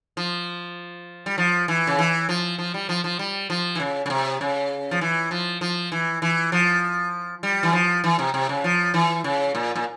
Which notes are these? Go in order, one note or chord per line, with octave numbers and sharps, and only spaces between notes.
F3
G3
F3
E3
C#3
E3
F3
F3
G3
F3
F3
G3
F3
E3
C#3
C#3
C3
C#3
F3
E3
F3
F3
E3
E3
F3
G3
E3
F3
E3
C3
C3
C#3
F3
E3
C#3
A#2
A#2